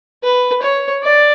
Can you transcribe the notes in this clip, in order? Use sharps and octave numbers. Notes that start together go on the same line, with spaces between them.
B4
C#5
D5